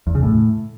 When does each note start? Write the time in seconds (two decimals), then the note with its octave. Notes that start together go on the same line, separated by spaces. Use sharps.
0.07 E2
0.15 C#3
0.23 A2